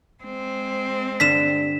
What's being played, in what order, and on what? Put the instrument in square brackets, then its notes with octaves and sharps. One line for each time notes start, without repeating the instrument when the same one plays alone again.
[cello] G#3 C4
[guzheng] G2 D3 G3 [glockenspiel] B6 E7